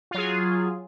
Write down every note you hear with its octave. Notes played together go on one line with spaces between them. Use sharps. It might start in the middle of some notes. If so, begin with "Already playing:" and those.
F#3 F4 G#4